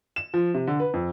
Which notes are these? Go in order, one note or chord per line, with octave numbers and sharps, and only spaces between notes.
E7
F3
C3
D3
B4
F2